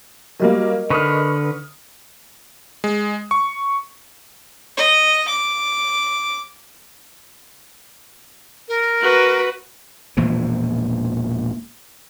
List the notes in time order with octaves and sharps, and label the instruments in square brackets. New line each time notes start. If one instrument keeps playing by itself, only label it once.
[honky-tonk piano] F#3 G3 A#3 [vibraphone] A#4 D#5
[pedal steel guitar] D3 B4 [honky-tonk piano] C#6 D#6 F6
[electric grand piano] G#3
C#6
[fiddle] D#5
D6
[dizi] A#4
[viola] F#4 B4
[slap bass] E1 A#2 E3 F3